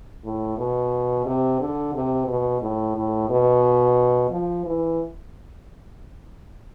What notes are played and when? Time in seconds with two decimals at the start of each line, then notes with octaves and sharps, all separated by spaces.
0.24 A2
0.58 B2
1.26 C3
1.60 D3
1.94 C3
2.27 B2
2.62 A2
2.96 A2
3.29 B2
4.31 F3
4.65 E3